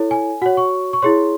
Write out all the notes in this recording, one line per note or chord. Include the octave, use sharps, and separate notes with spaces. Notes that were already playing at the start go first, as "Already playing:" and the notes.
Already playing: E4 A4 C#5
G#5
F#4 C#5 F#5
C#6
C#6
E4 G#4 C#5 C6